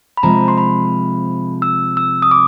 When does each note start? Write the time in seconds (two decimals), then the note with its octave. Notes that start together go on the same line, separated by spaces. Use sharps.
0.17 B5
0.23 C3 F3 G#3 A#5
0.48 C6
0.58 B5
1.62 E6
1.97 E6
2.22 D#6
2.31 D6